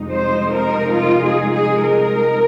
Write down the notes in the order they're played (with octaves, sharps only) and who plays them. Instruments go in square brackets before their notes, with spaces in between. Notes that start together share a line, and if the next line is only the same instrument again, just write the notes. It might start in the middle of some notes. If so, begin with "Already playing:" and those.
Already playing: [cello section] F2 C3 G#3 D#4
C5
A#4
F4
G#4
G#4
A#4